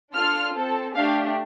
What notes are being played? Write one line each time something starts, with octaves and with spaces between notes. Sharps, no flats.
D4 F4 A4 F6
C4 A4
A3 D4 G4 F5